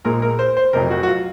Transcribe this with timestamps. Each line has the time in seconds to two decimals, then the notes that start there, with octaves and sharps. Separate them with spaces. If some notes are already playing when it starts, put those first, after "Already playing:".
0.05 A#1 A#2 G#3 A#4
0.22 A#4
0.39 C5
0.57 C5
0.73 F1 F2 C3 F#3 A#4
0.90 F#4
1.03 F#4
1.08 F4